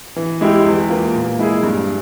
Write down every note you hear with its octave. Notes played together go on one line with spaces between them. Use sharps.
E3
G#3 E4 G4
E2
E3 A#3 F4
A#2
G#3 E4 G#4
G2